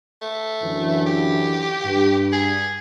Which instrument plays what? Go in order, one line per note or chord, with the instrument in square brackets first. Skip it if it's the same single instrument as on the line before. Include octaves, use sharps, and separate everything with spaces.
[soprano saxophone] A3
[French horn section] F#2 D3 E3
[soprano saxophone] G4
[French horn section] G2
[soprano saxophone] G#4